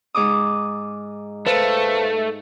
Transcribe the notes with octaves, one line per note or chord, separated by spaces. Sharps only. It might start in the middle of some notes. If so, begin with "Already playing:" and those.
G#2 D6 D#6
A3 B4 C5 F5